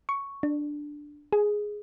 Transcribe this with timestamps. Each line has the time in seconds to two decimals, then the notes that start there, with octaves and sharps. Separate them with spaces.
0.09 C#6
0.43 D4
1.33 G#4